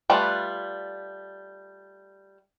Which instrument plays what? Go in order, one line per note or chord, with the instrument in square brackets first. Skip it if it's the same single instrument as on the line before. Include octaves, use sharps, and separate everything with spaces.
[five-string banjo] G3 A3 F4 B4 D5